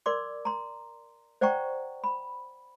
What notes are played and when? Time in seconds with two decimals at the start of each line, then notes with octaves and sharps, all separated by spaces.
0.06 A#4 D5 C6 D6
0.45 A#5 C6
1.41 C5 D5 F#5 G5 A#5 C#6
2.04 B5